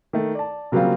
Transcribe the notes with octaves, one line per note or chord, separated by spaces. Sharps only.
D#3 A3
D5 A5
C#3 F#3 G3 A#3 C4 F4